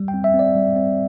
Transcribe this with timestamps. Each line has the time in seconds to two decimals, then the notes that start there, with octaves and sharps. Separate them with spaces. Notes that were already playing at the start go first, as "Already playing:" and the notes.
Already playing: G3
0.08 G5
0.14 C4
0.24 E5
0.34 C4
0.39 D5
0.55 G3
0.76 C4